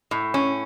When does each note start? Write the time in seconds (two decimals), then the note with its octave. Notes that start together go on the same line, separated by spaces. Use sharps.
0.11 A2
0.34 C#4